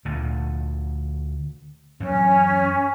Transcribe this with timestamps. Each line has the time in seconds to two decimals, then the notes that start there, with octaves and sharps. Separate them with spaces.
0.05 D2 A#2 D3
2.00 F#2 E3 C#4